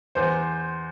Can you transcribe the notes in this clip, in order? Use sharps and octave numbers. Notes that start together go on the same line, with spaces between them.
E2 C5